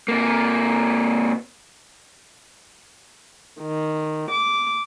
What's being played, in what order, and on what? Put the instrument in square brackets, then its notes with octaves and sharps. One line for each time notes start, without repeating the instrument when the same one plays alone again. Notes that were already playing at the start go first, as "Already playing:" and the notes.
[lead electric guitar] C3 A#3
[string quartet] D#3
D6